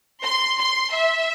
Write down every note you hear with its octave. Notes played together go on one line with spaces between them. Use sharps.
C6
C6
E5